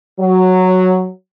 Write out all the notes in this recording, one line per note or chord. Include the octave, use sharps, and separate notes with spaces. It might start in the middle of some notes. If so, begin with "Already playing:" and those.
F#3